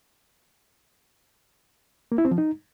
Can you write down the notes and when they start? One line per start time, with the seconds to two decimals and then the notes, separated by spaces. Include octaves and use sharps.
2.12 A#3
2.18 E4
2.25 C4
2.31 F3
2.38 D#4